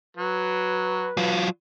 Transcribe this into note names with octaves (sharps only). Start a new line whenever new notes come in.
F#3 B4
F#3 F4